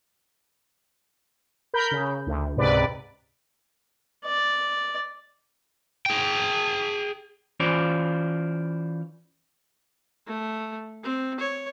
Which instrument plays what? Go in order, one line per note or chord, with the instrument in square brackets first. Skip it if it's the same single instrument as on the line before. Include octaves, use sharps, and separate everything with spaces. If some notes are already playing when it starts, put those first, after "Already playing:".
[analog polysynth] A#4 B5 G6
C#3
D2
C#2 G#2 C3 B4 D5
[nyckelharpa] D5
[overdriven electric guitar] G#4 G5
[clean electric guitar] E3 C#4 F4 C5 D5
[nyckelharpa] A3
C4
C#5